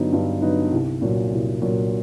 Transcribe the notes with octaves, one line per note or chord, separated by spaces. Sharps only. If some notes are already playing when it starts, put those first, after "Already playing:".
Already playing: G2 D3 F#3 B3 D#4
G2
D3 F#3 B3 D#4
C2
A#2 F#3
C2
A#2 F#3